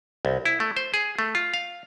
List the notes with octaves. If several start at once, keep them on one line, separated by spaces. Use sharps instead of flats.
C2
E4
A3
C5
G#4
A3
F4
F5